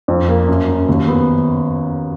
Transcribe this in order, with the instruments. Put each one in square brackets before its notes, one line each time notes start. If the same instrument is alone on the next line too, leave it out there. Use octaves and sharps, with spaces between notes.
[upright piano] F2
A#3
F#2
F#2
D#2
B3